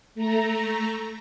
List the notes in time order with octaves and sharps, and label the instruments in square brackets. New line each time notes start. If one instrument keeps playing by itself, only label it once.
[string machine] A3 A#5